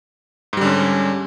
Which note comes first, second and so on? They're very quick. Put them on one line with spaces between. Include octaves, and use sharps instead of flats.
G#2 G3 D3 C#4